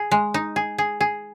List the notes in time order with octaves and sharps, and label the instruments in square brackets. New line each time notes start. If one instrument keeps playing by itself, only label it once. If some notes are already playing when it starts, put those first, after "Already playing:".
Already playing: [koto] G#4
G#3
D#4
G#4
G#4
G#4